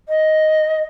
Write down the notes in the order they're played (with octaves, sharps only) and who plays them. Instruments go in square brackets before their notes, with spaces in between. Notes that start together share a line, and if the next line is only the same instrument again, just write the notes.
[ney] D#5